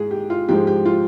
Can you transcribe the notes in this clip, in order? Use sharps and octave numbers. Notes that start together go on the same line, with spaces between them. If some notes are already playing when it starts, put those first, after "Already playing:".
Already playing: G#2 G#4
G4
F4
G#2 F3 G#3 G4
G4
F4